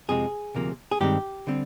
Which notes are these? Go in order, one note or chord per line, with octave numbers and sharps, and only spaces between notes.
F2 C3 F3 G#3 G#4
D2 C3 F3 A#3
G#4
G2 D#3 G#3 C4 G4
D3 G3 C4